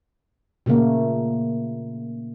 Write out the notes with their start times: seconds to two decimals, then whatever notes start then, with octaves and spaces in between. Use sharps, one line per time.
0.66 A#2 C#3 A3 A#3